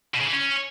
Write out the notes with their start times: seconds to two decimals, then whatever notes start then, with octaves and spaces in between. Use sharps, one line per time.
0.14 B2
0.21 C#3
0.27 E3
0.33 C#4